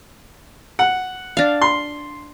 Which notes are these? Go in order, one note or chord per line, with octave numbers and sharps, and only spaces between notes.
F#5
D4 F5
C6